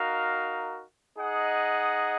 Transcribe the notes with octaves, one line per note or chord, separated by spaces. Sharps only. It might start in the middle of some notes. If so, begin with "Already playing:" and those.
Already playing: D#4 F#4 A#4 F5
D#4 G#4 D#5 F#5